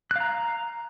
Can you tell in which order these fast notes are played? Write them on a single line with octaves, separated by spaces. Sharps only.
F#6 F5 A#5